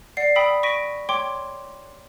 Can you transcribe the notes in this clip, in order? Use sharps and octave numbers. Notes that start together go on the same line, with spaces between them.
D5 F#5 C7
G5 B5 D#6 E6 B6
C#6 A#6 B6 D7 D#7
C#5 G5 C6 D6 G#6